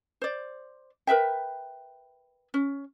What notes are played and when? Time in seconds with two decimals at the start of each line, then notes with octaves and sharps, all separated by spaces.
0.22 C5 D5
1.07 A#4 B4 E5 G5
2.54 C#4